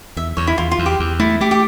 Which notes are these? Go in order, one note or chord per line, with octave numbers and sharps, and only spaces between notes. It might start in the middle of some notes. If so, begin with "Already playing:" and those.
E2 E5
E2 C#5
E4
E2 F4
F4
E2
G4
E2
A3 E4
A3 G4
G4